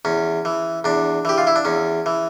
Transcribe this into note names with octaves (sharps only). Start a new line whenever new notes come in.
E2 C#4
E3
E2 D4
E3 G4
F4
E4
D4
E2 C#4
E3